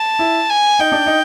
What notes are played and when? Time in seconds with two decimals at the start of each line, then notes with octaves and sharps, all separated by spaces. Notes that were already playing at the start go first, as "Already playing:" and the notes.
Already playing: A5
0.19 E4
0.49 G#5
0.79 D#4 G5
0.92 D4
1.06 D#4